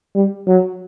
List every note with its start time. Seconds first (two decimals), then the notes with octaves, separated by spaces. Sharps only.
0.15 G3
0.47 F#3